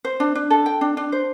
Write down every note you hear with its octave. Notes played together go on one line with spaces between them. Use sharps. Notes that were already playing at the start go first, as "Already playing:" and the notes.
C5
D4
D4
A4
G5
D4
D4
C5